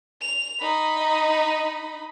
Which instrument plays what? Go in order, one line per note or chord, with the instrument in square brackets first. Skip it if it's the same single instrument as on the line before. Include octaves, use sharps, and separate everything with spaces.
[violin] F7
D#4 B5
[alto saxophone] D#5